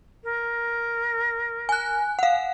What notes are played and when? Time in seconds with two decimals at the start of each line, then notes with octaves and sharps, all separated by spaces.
0.24 A#4
1.69 G#5 F#6
2.19 F5 F#5